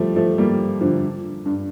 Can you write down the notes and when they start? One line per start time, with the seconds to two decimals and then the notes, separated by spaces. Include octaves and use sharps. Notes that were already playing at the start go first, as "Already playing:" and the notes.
Already playing: F3 G3 A3
0.16 F3 A3
0.38 G3 A#3
0.81 D3 F3
1.46 G2